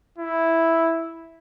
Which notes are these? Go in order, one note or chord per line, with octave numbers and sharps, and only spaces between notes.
E4